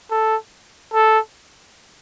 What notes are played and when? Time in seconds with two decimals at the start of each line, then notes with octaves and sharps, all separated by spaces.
0.11 A4
0.94 A4